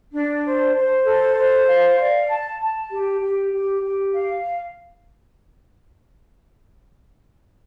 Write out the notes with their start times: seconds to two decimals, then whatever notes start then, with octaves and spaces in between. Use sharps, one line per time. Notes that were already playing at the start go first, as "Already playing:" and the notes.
0.13 D4
0.44 C5
0.75 C5
1.05 A4
1.36 C5
1.67 F5
1.98 D5
2.28 A5
2.60 A5
2.90 G4
3.21 G4
3.51 G4
3.82 G4
4.12 F5